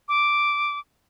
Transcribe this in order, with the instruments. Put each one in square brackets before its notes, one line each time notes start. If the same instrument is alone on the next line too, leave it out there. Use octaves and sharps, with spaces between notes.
[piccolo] D6